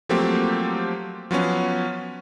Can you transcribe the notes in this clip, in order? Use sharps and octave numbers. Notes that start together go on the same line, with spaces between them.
F3 F#3 A3 A#3 C4 G4
F3 F#3 B3 C#4